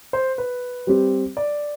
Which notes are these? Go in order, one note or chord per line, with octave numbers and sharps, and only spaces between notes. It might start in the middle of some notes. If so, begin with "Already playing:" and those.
C5
B4
G3 C4 G4
D5